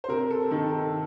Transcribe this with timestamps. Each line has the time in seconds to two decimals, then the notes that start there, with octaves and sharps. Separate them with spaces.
0.04 C5
0.08 C3 A#4
0.31 A4
0.51 D#3 A4
0.72 A4